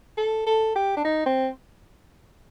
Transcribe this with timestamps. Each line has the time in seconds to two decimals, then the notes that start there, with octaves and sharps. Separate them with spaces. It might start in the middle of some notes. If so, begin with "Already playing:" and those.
0.17 A4
0.46 A4
0.75 G4
0.97 D4
1.04 D#4
1.26 C4